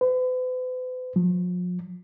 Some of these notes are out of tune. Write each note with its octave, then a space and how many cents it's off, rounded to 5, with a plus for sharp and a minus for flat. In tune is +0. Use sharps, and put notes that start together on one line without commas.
B4 +45
F3 +45